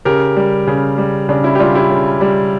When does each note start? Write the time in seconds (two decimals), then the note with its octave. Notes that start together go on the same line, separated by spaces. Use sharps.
0.05 C#3 G4 A#4
0.37 G3
0.67 C#3
0.98 G3
1.29 C#3 D4
1.44 C#4 E4
1.55 G4
1.59 G3 D4 F4
1.75 E4 G4
1.90 C#3
2.21 G3